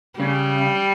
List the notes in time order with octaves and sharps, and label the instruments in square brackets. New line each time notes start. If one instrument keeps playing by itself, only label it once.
[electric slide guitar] C#3 [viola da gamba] G3